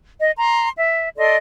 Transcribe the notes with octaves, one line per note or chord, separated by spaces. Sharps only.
D#5
A#5 C6
E5
A4 D5 D#5 C6